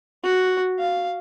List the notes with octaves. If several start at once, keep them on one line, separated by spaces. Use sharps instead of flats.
F#4
F5